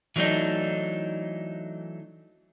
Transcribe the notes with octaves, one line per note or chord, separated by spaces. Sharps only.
E3 F#3 A3 D4 D#4